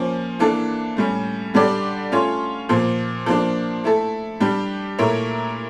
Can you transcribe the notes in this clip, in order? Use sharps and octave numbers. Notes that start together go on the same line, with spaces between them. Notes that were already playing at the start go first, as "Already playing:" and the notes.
Already playing: F3 A#3 C#4
E3 A#3 D4 A4
A2 G3 C#4
D3 G3 D4 G4 D5
A3 C#4 F4 C#5
A#2 F3 A#3
F3 A#3 D4
A3 E4 A4
G3 D4 G4
A#2 A3 E4 A#4 C#5